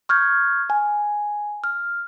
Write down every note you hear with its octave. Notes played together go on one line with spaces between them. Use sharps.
C#6 F6 G6 G#6
G#5
F6